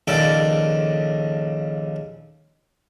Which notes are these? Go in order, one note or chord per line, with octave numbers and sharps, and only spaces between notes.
A#1 D#2 C#3 A4 D5 D6